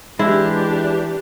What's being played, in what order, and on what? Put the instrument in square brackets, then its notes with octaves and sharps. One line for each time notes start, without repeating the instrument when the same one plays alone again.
[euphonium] E3 [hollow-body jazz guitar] G#3 [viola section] D4 G4 [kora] E4